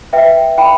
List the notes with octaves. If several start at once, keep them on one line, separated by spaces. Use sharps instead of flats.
B4 E5 G5
E4 G5 B5